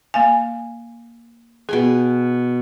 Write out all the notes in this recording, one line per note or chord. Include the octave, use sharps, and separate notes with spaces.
A#3 F5 G#5
B2 G#4 G5 G#5